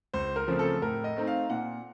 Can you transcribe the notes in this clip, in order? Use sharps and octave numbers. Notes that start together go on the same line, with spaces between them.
C#2 C5
A#4
C#3 F3 A3 C4
A4
A2 A#4
D#5
A3 C4 D#4
F5
A#2 F#5